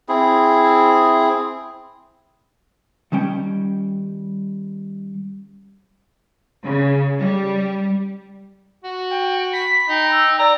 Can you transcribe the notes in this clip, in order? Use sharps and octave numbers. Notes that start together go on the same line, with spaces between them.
C4 E4 G#4
D#3 G3 C#4 G5
C#3
G3
F#4
G5
B5 B6
D#4 G5
E6
D5 A#5